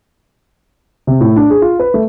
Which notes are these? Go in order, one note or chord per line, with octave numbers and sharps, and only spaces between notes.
C3
A2
D4
G#4
F4
B4
A3